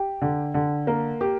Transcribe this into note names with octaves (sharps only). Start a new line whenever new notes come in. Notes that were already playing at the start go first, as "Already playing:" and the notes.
Already playing: G4 G5
D3
D3
A#3
G4 A#4